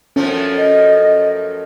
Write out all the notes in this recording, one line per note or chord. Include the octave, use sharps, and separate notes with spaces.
F#2 F3 A3 C#4
D#5